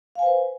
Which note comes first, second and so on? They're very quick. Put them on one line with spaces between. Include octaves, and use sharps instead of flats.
F5 G#5 C5 B4